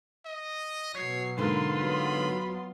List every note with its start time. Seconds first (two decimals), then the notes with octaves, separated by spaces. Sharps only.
0.25 D#5
0.95 B2 F#3 C#5 C7
1.38 G#2 D3 A#3 F4 B4 C6
1.79 F#3 B3 B5